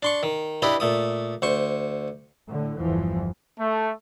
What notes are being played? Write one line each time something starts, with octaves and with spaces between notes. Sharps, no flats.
D4 C6 C#6
D#3
D4 E4 G4 B4 D#5
A#2 A3 D#6
D2 C5 C#6
A2 D3
G1 E2 E3 F3
A3